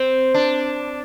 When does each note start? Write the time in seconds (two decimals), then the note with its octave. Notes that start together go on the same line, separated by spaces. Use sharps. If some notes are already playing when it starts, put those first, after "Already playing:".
Already playing: C4
0.34 D4